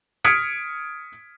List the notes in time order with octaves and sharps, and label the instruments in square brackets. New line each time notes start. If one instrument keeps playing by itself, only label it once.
[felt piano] D#6 F6 G#6 B6 C#7 D7